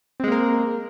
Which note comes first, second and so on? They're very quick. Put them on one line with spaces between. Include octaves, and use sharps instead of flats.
C4 G#3 A#3 A#4